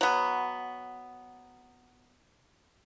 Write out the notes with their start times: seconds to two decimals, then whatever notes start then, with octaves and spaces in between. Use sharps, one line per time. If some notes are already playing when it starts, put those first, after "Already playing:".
0.01 F#3 B3